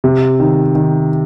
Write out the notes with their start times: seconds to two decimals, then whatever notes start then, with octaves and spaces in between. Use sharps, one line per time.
0.04 C3
0.40 D#3
0.75 D#3